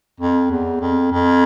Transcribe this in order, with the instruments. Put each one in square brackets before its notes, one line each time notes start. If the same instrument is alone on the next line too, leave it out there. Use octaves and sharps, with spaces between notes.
[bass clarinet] F2
E2
F2
F2